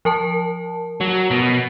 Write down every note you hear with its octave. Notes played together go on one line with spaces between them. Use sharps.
F3 A#4 A5
F#3
B2